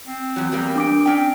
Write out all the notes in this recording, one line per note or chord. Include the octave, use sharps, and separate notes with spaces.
C4
E2 F#3
E2 G3 A#3
D4 D6 D7
C4 C#4 G5